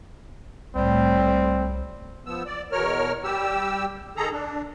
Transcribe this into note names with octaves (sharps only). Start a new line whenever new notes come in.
C2 A2 G3 C4
F3 B3 E6
D5
E2 B2 A#4 C#5 F6
G3 G4 E6
D#3 G#4 A4 A#5
D4